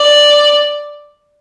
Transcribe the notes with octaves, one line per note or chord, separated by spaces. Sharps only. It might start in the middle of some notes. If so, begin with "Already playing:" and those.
Already playing: D5